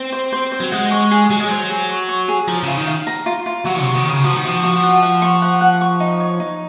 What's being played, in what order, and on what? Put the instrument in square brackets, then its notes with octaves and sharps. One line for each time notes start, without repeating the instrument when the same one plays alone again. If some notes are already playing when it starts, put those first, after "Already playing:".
Already playing: [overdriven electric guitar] C4
[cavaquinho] C5
C5
C5
[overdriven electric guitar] F#3
[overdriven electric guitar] G#3 [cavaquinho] F#5
[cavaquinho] C#6
G#4
[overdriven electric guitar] F#3 [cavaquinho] G#4
[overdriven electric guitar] G#3
[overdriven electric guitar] F#3 [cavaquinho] C5
[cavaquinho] G#4
C#6
C#6
G#4
[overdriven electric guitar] F3 [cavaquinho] A#5
[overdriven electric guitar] C#3 [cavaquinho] F4
[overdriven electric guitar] D#3
[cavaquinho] F5
A#5
F4
F4
[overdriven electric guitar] F#3 [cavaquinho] F#4
[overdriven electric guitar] C3 [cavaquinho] C#5
[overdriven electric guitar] D#3
[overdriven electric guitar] C#3 [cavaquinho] A#4
[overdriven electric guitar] F3 [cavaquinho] F#4
[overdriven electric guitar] D#3
[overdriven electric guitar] F3 [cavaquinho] F#4
[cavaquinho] F#4
F#5
F#5
C#6
F#5
F#5
C#6
D#4
C#5
D#4